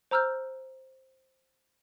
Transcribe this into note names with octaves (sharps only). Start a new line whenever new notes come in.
C5 A#5 E6 F6 G6